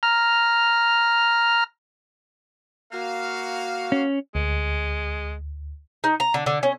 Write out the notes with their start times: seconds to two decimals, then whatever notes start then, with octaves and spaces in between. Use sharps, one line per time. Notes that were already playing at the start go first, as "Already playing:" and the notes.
0.03 A#5 F6
2.92 A#3 F#4 F5
3.92 C#4
4.35 D2 G#3
6.04 D#4
6.20 A#5
6.34 D3
6.46 D3
6.63 C#4